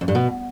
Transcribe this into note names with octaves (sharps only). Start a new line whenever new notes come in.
F2
G2
B2